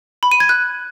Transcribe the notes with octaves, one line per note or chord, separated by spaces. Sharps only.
B5
D#7
G#6
F#6